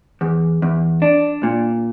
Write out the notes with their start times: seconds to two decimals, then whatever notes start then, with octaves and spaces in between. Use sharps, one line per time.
0.21 E2
0.62 E2
1.02 D4
1.43 A#2